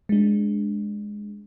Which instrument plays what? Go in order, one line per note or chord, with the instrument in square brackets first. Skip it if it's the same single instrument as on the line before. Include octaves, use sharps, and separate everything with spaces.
[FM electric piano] G#3 D4